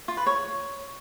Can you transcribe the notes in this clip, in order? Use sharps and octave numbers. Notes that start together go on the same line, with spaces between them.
F4
B4
C#5